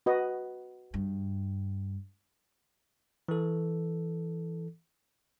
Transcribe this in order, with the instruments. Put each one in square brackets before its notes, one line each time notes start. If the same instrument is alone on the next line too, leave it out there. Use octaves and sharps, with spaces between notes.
[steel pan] F#4 B4 D#5
[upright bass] G2
[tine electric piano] E3 A4